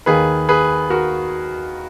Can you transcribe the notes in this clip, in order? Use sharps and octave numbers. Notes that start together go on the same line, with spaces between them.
D#2 D#3 A#3 G#4 B4
G#4 B4
F#4 A#4